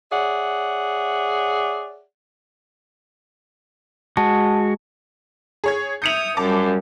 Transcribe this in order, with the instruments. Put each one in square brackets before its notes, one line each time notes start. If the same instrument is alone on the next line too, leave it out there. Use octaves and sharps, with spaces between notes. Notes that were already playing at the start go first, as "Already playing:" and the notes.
[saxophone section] G#4 C#5 D5 E5 F#5
[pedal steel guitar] G#3 F#4 [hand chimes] A5
[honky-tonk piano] G#4 C#5 G#6
[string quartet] E5 D#6 [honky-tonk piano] G6 C#7 F7
[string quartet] F#2 G3 [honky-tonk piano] A5 D6